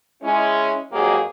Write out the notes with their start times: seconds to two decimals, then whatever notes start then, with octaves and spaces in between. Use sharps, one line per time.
0.22 G#3 C#4 E4
0.92 F2 G#2 F#3 A#3 G4 G#4